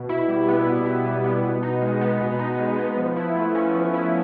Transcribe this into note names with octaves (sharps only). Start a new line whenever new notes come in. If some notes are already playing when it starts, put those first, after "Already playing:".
Already playing: B2
E4
G3
B3
B2
E4
G3
B3
B2
D#4
G#3
B3
B2
D#4
G#3
B3
F3
E4
A3
C#4
F3
E4